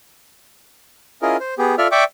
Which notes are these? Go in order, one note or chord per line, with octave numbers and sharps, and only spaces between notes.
C#4 E4 F4 G#4 A#4 D#5
C5
B3 G4 G#4
F4 A4 D5 E5 F6
D5 E5 G5 C#6 D6